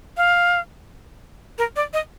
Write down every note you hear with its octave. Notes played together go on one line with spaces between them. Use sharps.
F5
A#4
D5
D#5